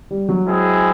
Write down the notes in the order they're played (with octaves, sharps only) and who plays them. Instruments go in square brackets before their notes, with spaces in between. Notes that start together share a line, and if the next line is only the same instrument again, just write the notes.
[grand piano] G3
F#3
[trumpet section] G#3 C4 E4 G#4